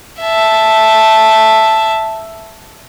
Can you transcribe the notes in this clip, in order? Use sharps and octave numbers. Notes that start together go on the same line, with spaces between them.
E5 A5